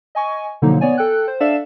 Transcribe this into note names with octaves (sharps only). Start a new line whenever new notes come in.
D#5 G#5 C#6
B2 D3 F3 F#3 A#3 D#4
B3 C#5 D5 G#5
A4 G5 F#6
C5
D4 A4 D5 E5 F5 E7